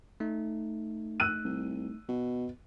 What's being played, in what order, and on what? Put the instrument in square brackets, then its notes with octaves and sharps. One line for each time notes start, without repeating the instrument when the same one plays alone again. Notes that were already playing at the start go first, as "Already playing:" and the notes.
[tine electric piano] A3 D#4
[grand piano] E6 F#6 D#7
[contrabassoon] C2
B2